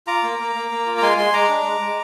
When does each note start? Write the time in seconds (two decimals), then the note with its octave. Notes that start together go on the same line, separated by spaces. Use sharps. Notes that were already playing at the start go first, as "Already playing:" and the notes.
0.07 F4 A#5 D6
0.23 A#3
0.39 A#3
0.55 A#3
0.71 A#3
0.86 F4
0.98 A#5
1.02 G#3 G#5 C6
1.18 G#3 G#5 C6
1.33 G#3 A#5 D6
1.49 D4
1.65 G#3
1.81 G#3